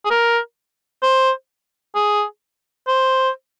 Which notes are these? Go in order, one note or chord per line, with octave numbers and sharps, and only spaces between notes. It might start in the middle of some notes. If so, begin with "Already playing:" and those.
G#4
A#4
C5
G#4
C5